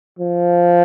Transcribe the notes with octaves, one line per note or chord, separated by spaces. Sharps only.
F3